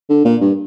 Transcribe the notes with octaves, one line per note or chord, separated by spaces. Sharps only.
D3
A#2
G2